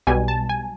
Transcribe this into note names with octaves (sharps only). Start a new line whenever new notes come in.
B1 B2 G3 G#5
A5
G#5